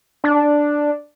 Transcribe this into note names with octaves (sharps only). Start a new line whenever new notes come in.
D4